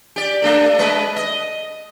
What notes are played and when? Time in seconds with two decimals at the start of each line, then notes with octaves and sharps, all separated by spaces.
0.16 G4 D5
0.42 A3 D4 A4
0.79 G#3 B4 D#5
1.16 D#5